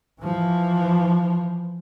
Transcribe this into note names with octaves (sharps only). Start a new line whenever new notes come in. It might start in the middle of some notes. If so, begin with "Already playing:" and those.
E3 F3